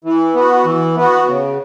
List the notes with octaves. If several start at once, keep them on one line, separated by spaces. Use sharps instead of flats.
E3
B3 F#4
E3
B3 F#4
C#3